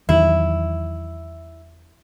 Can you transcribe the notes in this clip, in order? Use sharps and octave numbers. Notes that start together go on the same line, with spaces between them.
E2 D#3 F#3 E4